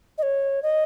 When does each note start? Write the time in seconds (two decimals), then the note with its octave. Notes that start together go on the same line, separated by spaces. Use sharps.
0.18 D#5
0.23 C#5
0.63 D#5